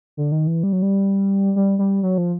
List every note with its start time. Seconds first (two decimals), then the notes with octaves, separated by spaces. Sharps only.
0.17 D3
0.32 D#3
0.47 E3
0.63 G3
0.73 F#3
0.82 G3
1.56 G3
1.79 G3
2.03 F#3
2.18 F3